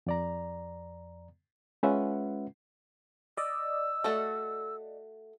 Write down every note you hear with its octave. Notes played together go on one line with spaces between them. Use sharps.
F2 D5 A#5
G#3 C#4 F4 B4 E5 F#5
D5 D#5 E6
A3 F#4 A4